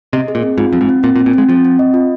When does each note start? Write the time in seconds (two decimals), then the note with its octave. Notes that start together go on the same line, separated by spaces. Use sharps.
0.13 C3 D#5
0.28 G#4
0.35 A#2
0.43 C4
0.58 G#2 F4
0.73 F2 C4
0.81 G#2
0.89 C4
1.03 A#2 C4
1.16 A#2
1.19 C4
1.26 A#2
1.33 G#3 C4
1.49 F3 C4
1.65 C4
1.79 D#5
1.94 F4